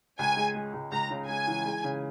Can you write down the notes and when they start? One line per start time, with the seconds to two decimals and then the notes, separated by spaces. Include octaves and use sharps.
0.19 C#2 G#5
0.37 G#3
0.55 G#3
0.73 C#2
0.91 C#2 A#5
1.10 C#3
1.28 G#3 G#5
1.47 E3
1.65 G#3
1.84 C#3